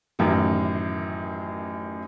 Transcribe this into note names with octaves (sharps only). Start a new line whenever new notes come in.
A1 F#2 A2 D#3